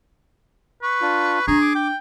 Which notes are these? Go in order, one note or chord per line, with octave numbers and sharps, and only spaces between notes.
B4 C#6
D4 F4
D4 G#4 A#5
D6
G5